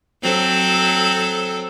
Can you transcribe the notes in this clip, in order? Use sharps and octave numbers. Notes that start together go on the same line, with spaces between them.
F#3 C4 A4